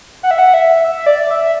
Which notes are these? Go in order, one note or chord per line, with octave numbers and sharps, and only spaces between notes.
F#5
E5
F#5
E5
E5
D5
E5